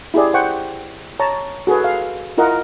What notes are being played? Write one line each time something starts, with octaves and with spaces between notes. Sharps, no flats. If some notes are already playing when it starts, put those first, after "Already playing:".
E4 G4 G#4 D5
C5 F#5 G5 C#6
C#5 A5 A#5
F#4 G#4 A4 B4
F5
E4 F4 A#4 D#5 F#5